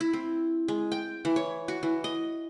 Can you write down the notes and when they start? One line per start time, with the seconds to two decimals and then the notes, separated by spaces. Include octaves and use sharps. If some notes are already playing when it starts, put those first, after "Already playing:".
0.01 E4
0.13 C4
0.68 G#3
0.92 G5
1.25 E3
1.36 C#5
1.68 F#4
1.83 E3
2.04 D#5